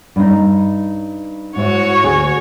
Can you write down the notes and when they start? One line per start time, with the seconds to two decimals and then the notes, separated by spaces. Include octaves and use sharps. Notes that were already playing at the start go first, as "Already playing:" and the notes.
0.16 G2 D#4
1.56 G#2 E4 F#4 C#5
2.03 D2 G#4 G#5